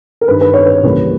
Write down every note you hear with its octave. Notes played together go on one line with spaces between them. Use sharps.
A#4
G2 D#3 G3 B4
B4
C#5
B4
C#2 C#3 E3 G3 A#3 B4